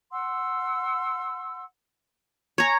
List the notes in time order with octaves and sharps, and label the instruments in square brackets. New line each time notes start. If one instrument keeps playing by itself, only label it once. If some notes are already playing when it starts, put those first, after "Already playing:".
[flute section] F#5 C6 E6
[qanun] C#5 A#5 [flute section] G#5